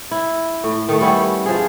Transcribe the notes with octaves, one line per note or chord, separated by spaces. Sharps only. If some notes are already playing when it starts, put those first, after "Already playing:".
E4
A2
D#3 A3
G3 B3 C#4 E4
F3 G#4